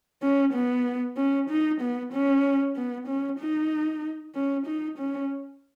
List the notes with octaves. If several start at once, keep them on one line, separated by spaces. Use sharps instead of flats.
C#4
B3
C#4
D#4
B3
C#4
B3
C#4
D#4
C#4
D#4
C#4